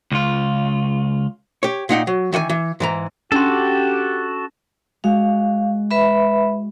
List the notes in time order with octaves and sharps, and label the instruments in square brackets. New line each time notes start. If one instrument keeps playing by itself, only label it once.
[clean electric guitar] C#2 F4
[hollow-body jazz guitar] G4 C#5
A#2 D#4 F#5 G5
F#3
D#3 E3 F#5 G#5
E3
G#2 E3 A#5
[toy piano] C#4 D4 C6 [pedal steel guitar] F#4 A4 [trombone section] G4
[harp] G#3 F#4 [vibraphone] F5
[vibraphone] B4 E5 B5